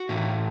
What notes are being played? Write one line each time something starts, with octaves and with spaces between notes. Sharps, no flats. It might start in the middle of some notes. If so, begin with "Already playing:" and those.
Already playing: F#4
A2 E3